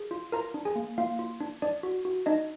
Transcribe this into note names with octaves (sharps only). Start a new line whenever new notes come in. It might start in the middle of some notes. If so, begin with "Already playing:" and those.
Already playing: G#4
F4
F4 A#4 A#5
D4
G#4 G#5
A#3
A#3 F4 F5
F4
D4
D4 D5
F#4
F#4
D4 D#4 D#5